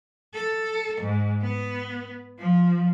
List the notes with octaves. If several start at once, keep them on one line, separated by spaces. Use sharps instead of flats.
A4
G#2
B3
F3